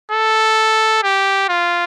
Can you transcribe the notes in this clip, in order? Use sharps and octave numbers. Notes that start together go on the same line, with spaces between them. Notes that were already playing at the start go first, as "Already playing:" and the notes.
A4
G4
F4